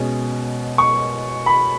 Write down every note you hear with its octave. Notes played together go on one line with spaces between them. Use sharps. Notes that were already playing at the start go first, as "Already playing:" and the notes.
Already playing: B2 G#3 C#4
C#6
B5